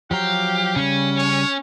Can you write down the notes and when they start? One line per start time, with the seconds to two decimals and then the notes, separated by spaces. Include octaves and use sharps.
0.11 F3 F#3 G4 F5 A#5
0.76 C#3 G3 C#4
1.17 C#5